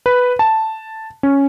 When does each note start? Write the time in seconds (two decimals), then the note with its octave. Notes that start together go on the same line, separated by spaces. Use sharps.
0.06 B4
0.39 A5
1.23 C#4